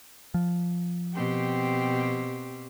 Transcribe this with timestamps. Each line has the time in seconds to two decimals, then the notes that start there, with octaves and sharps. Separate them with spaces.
0.34 F3
1.14 B2 C4 G4